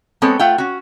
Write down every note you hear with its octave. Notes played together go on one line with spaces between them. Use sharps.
G#3 B3 C4 A4 C#5
A3 F4 F#5 G5
C#4 F#4